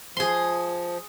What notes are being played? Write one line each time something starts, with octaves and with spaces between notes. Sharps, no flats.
F3 G#4 C6